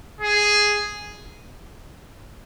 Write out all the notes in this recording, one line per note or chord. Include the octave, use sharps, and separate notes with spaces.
G#4